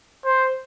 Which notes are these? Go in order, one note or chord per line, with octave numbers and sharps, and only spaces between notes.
C5